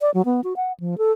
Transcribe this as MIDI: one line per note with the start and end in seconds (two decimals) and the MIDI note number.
0.01 0.11 74
0.14 0.22 54
0.25 0.41 59
0.44 0.53 66
0.56 0.73 78
0.80 0.98 53
0.98 1.12 69